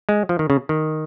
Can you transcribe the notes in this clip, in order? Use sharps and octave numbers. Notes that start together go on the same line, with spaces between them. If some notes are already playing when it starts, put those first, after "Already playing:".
G#3
F3
D#3
C#3
D#3